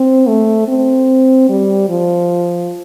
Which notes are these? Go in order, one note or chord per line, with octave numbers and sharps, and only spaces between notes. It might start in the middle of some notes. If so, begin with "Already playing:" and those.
Already playing: C4
A3
C4
G3
F3